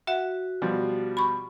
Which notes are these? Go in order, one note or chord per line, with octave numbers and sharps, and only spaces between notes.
F#4 E5 F#5
B2 F3 G3
B5 C#6